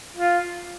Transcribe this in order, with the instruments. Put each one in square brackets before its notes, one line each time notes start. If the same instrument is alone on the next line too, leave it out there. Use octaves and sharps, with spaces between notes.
[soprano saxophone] F4